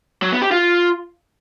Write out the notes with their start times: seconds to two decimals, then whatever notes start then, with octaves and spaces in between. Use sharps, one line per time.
0.22 F#3
0.32 B3
0.42 G4
0.51 F4